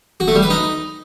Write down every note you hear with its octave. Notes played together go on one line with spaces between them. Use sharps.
F#4
A3
G3
B4
D#4